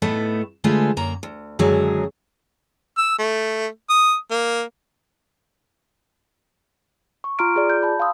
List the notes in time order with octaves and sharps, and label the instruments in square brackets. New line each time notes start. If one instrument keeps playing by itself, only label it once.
[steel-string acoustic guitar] A2 A3 B3 D#4
D3 G#3 A3 F4 G#4 B4
F#2 A#3 A#5
D2
F#2 D3 D#3 F#3 G#3 G#4
[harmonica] E6
A3
D#6
A#3
[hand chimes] C#6
F4 A#5 C6 F6 D7
F4 G#4 D5
G6
A5 B5
F5 C6 D#6 E6